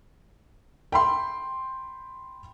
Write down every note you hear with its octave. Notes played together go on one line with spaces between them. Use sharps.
G5 B5 C6